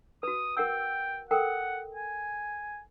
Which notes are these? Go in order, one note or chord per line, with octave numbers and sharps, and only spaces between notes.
F#4 B4 D#6
A#4 F#5 G5 E6
A4 A#4 F#5 G5
G#5